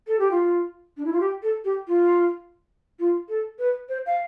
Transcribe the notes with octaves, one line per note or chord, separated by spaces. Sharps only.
A4
G4
F4
D4
E4
F4
G4
A4
G4
F4
F4
A4
B4
C5
F5